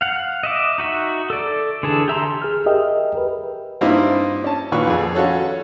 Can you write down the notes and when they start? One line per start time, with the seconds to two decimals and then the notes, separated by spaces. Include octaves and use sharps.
0.01 F5 F#5
0.43 D#5 E5 D6
0.78 D#4 F#4 E5
1.30 A4 D5
1.83 D3 E3 G#4 A4 A5
2.08 G4 E5 A#5 C6
2.42 G#4 F6
2.66 G4 G#4 A#4 D#5 E5 G5
3.15 A#4 B4
3.81 G2 A#3 C4 D#4 E4
4.44 C#4 A5
4.72 D#2 A#2 B4 C#6
4.87 F2 G#4
5.15 C#4 F4 F#4 A4 C#5